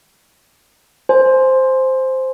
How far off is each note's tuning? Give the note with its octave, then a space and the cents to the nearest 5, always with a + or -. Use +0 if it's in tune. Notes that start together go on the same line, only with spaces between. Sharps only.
C5 +0 G#5 +20